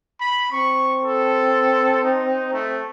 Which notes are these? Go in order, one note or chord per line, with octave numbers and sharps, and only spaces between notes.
B5
C4 C#6
A4
D#4
A3